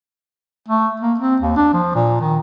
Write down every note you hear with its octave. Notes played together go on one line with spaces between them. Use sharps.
A3
A#3
C4
D#2
D4
F3
A#2
D#3